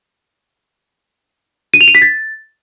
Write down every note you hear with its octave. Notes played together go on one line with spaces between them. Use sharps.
D#7
F7
D#7
B6
A6